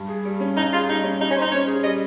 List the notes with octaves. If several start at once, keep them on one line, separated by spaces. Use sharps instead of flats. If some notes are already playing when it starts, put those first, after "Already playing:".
Already playing: G2
G#4
G3
C#4
G2 D#4
F4 G#4
G3 D#4
C#4
G3 D#4
C#4
C5
D#4
C#4 C#5
G#4
G3 D#5